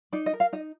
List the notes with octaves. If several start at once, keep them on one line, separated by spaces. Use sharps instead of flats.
D#4 D5
D#5
A#4
F5
D#4 D#5